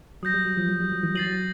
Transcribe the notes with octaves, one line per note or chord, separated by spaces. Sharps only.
F#3 D#6 G6 A#6
G3
F#3
F3
F#3
G3
F#3
E3
F#3 A6 C7 D#7 F#7
F#3